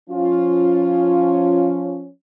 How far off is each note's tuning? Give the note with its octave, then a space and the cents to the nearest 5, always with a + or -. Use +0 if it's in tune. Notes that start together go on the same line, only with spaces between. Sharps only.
F3 +10 C#4 +0 F4 +0